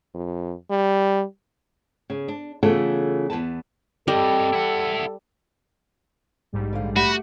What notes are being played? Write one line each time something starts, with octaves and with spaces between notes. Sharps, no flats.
F2
G3
C#3
D4
C#3 E3 A3 B3 F4 A4
E2 C#3 B4 A5
G3 C4 A4 D#5
E4 F#5
A#1 G#2 G3
D3 F5
A3 F#4 G4 F#5 B5